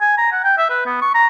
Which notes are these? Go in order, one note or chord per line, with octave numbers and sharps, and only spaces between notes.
G#5
A#5
F#5
G5
E5
B4
B3
C#6
A#5